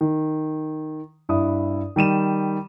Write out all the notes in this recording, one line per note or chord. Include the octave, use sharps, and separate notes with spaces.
D#3
G2 E4 D#6
D#3 G3 D#7 E7